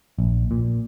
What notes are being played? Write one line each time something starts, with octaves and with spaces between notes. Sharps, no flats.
A#1
A#2